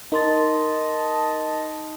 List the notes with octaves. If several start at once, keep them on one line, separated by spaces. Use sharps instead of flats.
D#4 A#4 D#5 A5 C6 A6